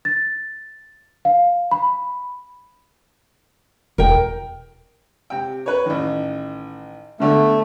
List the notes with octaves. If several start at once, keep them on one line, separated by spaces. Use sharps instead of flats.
A6
F5
B5
E1 A#4 G5
C3 G5
B4 C#5
A1 D#3
B2 D3 A3